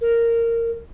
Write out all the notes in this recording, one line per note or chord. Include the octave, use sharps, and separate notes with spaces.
A#4